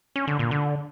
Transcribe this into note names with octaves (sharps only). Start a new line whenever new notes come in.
C#4
D3
A#2
D3